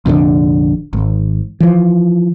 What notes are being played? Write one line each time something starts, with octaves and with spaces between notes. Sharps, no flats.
F1 A#1 A2 D3
G#1
E3 F3